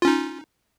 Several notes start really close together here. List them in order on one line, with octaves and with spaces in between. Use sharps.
F4 C#4 D#4